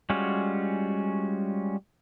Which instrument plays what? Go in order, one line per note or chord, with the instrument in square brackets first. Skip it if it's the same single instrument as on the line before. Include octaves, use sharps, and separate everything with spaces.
[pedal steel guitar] G3 G#3 C#4 F4 F#4